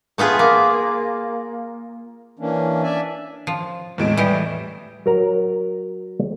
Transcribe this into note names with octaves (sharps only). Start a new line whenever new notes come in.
A3 B3 F4 G#4
A#3
E3 A#3 C#4 D4
D4 D5 E5 G#5
F3
E2 A2 G#3 D7
E3 G3 G4 D#5
F#3 A#4 A#5